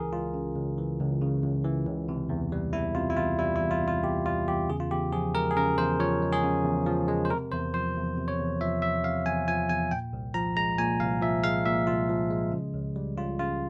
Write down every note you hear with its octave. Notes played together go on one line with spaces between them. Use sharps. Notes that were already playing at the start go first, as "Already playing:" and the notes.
Already playing: C#2 C#3 E3 G#4 A#4
C#2 F4
C#3
C#2
E3
C#2
C#3
C#2
E3
C#2
C3
E2
G3
E2 E4
C3 F4
E4
E2 F4
G3 E4
E4
E2
F4
C3 F4
E2 G4
G3 F4
E2 G4
C#3 G#4
F4
E2 G4
F3 G#4
G#3 A#4
G#4
C#3 A#4
E2 C5
F3 C#5
G#3
G#4
C#3
E2
F3
G#3
C5
C3 A#4
E2 C5
F3 C5
E2
C3
C#5
E2
F3 E5
E2 E5
C3 F5
E2 G#5
F3 G#5
E2 G#5
A#2 G5
C2
F3 A#5
G#3 A#5
A#2 G#5
C2 F5
F3 E5
G#3 F5
A#2 E5
C2 F4
F3
G#3
C#3
C#2
G3
C#2 F4
C#3 F4